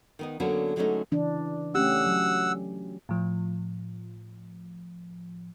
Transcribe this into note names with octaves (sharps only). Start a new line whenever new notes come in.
D#3 B3 D#4
D3 F#3 A#3 B3 C#4 D4
D3 F#3 G#3 A3 C#4 D#4
C#3 E3 D4
A3 C#4 G4 F#5 E6
F#3
A2 F3